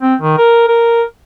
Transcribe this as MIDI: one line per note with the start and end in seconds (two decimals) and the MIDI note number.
0.01 0.15 60
0.22 0.37 51
0.38 0.66 70
0.68 1.02 70